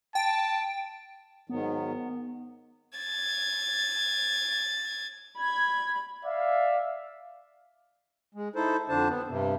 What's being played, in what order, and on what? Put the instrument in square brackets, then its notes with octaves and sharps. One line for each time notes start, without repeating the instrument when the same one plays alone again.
[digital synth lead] G5 [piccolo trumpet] A5
[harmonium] G#2 D#3 F#3 [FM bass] B3
[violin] G#6 A6
[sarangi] B5 [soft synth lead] G#6
[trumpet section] D5 E5 F5
[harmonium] G#3
D#4 E4 A4 C5
F2 D3 D4 C5 A5
B3
G2 C3